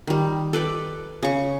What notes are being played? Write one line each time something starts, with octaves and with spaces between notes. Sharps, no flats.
D#3 G3
A4 B4 D5 G5
C#3 C#6